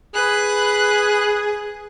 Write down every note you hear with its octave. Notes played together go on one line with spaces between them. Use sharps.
G#4 B4 F#6